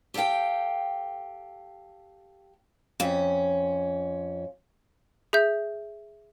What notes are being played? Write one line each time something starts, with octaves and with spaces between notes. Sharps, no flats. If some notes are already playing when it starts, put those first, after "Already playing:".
G4 A4 D5 F5 G5
F2 C#4
G#4 E5 G6